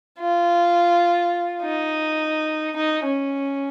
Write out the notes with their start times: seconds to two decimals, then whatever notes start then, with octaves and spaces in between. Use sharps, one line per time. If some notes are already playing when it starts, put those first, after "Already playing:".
0.19 F4
1.62 D#4
2.76 D#4
3.05 C#4